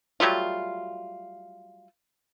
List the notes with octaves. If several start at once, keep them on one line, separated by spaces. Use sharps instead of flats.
F#3 G3 A3 F4